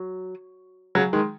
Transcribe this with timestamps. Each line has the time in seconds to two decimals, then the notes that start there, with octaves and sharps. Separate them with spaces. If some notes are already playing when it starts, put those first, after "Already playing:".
Already playing: F#3
0.95 C#3 F#3
1.13 D#3 G#3